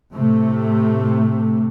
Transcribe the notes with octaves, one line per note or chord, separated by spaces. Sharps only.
A2 C3 A3